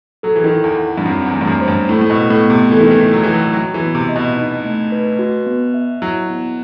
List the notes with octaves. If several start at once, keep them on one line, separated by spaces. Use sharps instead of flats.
F#3 A4
E3
D#3
E4
E2
F#5
G2
F#2 C4
E2
A3
G2
F#2
C5
G2
A2 E4
A2
B2
B3
A2
B3
C3
E3 A4
D#3
E3
E4
F#3
E3 G5
F#3
F#3 F#4
E3
B3
C3
D#5
B2
D#4
A3
B4
F#4
B3
E5
F#3 E4
B3